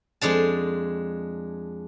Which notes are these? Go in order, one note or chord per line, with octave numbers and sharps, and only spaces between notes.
F2 G#3 D4 A5